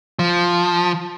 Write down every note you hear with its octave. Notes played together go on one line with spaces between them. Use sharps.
F3